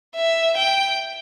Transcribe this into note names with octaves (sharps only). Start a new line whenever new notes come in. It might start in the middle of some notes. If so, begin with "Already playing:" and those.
E5
G5